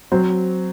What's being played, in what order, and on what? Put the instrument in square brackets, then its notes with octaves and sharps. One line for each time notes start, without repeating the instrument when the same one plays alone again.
[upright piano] F#3 C4 C5